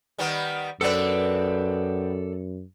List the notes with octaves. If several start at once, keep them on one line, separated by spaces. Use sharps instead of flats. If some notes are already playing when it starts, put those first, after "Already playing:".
D#3 G3 B3
F#2 B3 C4 A4 B4 D5